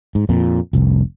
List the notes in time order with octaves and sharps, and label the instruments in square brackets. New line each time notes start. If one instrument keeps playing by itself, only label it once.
[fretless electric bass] G#2
F2 A#2
F1 C2